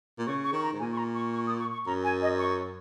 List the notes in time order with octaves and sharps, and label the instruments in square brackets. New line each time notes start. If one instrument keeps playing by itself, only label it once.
[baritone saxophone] A#2
[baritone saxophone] C#3 [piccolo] C#6
[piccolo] C#6
[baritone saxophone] D#3
[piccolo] A#5
[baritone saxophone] G#2
[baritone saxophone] A#2 [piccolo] G#5
[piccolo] C#6
A#5
C#6
C#6
D#6
C#6
C#6
[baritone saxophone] F#2 [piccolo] A#5
[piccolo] G#5
D#5
C#6